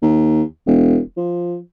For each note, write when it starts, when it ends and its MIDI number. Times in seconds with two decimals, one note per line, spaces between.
0.02 0.43 39
0.67 0.98 28
1.17 1.57 53